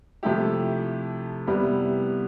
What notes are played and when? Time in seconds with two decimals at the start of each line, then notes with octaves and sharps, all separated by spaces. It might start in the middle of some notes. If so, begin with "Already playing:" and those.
0.23 C3 F3 A3 E4 G4
1.47 C3 G3 B3 E4